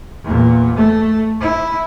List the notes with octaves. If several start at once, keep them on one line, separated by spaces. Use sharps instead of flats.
E2 A#2
A3
E4